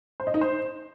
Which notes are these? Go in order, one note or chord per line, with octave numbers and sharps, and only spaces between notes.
C5
D#5
D#4
C5